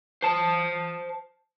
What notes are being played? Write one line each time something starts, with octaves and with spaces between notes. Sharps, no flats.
C5 A5